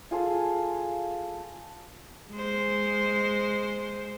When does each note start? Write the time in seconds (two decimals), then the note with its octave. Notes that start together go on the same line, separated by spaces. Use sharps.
0.11 F4 G#4 A4
2.32 G#3 C5